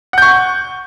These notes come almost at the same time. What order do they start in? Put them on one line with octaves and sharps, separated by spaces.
F#5 G6 C#6